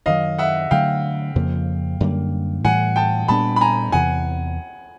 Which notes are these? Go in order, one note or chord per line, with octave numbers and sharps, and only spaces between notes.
F#2 D#3 F#3 D#5 F5
E5 F#5
D3 F#3 A3 F5 G5
F2 C#3 F3 A#3
F#2 D3 G3 A#3
A2 E3 G3 F#5 G#5
G5 A5
A#2 G3 B3 D4 A5 B5
B5
G#5 A#5
E2 C3 E3 F#5 G#5